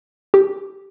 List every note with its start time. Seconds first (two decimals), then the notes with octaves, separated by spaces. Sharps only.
0.34 G4